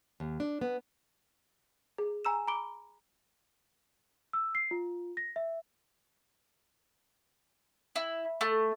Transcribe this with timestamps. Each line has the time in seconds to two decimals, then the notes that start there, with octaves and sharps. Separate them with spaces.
0.20 D#2
0.40 D4
0.61 B3
1.98 G#4
2.25 G#5 A#5 E6 E7
2.47 A#5 B5 D6 D7 G7
4.33 E6
4.55 C7
4.71 F4
5.17 A#6
5.36 E5
7.96 E4
8.41 A3